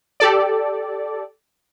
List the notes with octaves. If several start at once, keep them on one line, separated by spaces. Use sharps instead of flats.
G4 A4 D5